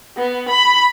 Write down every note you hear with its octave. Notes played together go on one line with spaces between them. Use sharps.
B3
B5